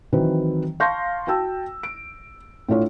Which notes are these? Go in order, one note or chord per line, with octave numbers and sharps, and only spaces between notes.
D#3 E3 F#3 C4 B4
F5 A5 C6 C#6 G6 A#6
F#4 G5 A5 E6
D7
A2 D4 F4 C#5